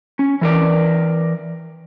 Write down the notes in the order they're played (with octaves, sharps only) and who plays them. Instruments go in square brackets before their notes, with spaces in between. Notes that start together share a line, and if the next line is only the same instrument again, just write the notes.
[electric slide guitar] C#4
E3 A#4 D5